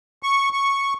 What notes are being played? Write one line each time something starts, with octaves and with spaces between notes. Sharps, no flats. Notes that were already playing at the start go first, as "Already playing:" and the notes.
C#6
C#6